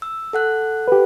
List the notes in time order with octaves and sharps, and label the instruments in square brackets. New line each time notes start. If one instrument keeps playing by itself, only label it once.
[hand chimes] E6
A4 F#5 F#6
[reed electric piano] G4 B4